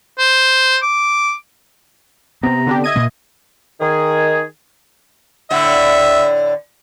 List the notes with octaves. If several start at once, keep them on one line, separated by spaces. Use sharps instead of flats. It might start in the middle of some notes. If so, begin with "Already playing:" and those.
C5
D6
C3 B3 C4 A#5
D3 D4 G4
D#5 E5 G#6 D#7
A#2 A#3
D#3 G#4
A2 D3 E5